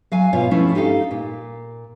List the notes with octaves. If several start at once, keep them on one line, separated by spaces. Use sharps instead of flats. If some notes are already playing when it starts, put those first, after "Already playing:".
F#3 F5 G#5
B2 F4 C#5 F5
F3 A3 C#4 E4
D#4 G4 A4 F5
A#2